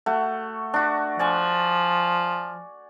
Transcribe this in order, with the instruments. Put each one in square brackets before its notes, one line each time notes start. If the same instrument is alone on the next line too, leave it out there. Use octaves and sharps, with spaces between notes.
[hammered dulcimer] A3 F#4
D4 F#4
[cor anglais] F3 [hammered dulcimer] D5 G#5 C#6